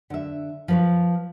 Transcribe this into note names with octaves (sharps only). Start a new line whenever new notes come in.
D3 E5
F3 B4 C#5